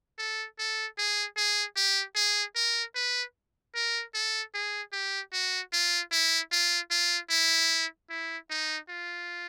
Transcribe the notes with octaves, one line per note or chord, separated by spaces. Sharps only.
A4
A4
G#4
G#4
G4
G#4
A#4
B4
A#4
A4
G#4
G4
F#4
F4
E4
F4
F4
E4
E4
D#4
F4